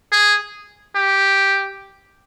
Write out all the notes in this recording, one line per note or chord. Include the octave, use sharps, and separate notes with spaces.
G#4
G4